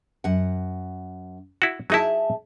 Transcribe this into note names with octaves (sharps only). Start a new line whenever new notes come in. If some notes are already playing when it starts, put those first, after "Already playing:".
F#2 F#5
E4 F#4
F#3 D#4 E4 G#4 E5 A5